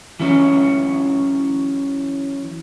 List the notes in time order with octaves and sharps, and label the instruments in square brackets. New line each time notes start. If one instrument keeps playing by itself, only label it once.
[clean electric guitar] E3 F#3 C#4